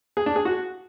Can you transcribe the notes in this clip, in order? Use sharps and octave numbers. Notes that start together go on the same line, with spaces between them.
G#4
D4
G#4
F#4